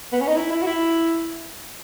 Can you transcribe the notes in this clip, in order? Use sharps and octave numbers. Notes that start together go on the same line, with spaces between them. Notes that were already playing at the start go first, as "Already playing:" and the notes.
B3
C#4
D#4
E4
E4
F#4
E4